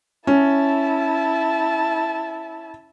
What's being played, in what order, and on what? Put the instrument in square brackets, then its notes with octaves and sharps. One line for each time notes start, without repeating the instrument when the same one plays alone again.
[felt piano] C#4 [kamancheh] E4 A5